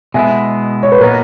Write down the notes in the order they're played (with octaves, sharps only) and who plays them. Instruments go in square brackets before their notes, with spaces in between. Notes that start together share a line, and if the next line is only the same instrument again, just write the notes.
[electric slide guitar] B2 G#3 B3 E4 [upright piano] E5 G#5
[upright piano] C#5
B4
[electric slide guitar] A#2 F#3 B3 D#4 [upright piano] A#4